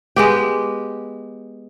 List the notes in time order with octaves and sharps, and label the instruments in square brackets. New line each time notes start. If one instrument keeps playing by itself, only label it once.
[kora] G#3 B3 G4